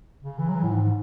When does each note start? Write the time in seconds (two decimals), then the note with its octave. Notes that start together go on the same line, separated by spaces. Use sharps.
0.23 C#3
0.39 E3
0.49 F#3
0.55 E3
0.63 A2
0.71 G#2